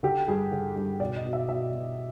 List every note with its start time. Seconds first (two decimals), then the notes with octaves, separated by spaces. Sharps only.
0.03 D3 G4
0.28 G2 G#4
0.51 D3
0.76 G2
1.00 B2 D5
1.16 D#5
1.25 B2
1.33 E5
1.49 B2 E5
1.73 B2